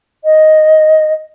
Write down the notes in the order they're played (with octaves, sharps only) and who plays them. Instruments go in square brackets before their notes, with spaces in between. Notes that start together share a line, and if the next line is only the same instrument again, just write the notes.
[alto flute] D#5